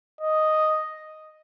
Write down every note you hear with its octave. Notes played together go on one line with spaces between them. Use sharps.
D#5